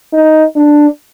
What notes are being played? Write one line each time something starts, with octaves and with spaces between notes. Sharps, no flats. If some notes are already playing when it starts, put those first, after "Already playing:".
D#4
D4